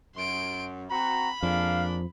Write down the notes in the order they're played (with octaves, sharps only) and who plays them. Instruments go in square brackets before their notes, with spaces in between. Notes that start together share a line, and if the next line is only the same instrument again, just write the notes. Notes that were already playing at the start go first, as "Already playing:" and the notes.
[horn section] F#2 [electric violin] C6 D7
[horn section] C4 F#4 [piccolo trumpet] A#5 [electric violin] B5
[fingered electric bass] F2 F3 [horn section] G#3 A#3 D4 [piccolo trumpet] F5